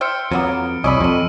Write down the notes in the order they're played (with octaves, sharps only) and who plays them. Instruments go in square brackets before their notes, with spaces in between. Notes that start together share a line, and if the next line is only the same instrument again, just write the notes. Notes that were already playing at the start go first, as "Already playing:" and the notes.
[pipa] C5 E5 G5 [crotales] F6 C#7
[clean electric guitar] F2 [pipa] F#3 A#3 B3
[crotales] D7
[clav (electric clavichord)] C2 [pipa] C#4 D5 B5 [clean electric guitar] D#5 [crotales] C#6 E6 D#7
[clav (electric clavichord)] F2 [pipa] C4 A4